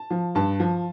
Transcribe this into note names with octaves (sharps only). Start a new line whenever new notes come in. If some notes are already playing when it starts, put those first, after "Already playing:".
Already playing: A5
F3
G2 A5
F3